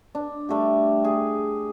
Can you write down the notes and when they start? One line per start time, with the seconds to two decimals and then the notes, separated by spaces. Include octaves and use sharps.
0.15 D4
0.49 G3 A3 D4 G4
1.04 G#4